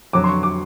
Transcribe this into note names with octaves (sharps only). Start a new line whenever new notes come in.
F2 D3 F#3 D6
C6
C#6
D6